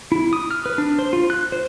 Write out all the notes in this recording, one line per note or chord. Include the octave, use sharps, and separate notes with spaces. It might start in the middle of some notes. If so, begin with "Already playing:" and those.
E4
D#6
F6
B4
D4
C5
F4
F#6
C5